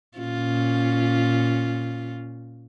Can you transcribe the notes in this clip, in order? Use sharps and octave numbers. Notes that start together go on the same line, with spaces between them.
A#2 C#4 F4